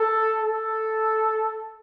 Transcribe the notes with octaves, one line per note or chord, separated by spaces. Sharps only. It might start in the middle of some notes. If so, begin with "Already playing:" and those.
Already playing: A4
A4